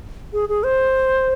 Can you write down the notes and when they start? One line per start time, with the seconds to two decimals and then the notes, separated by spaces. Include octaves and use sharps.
0.33 G#4
0.49 G#4
0.64 C5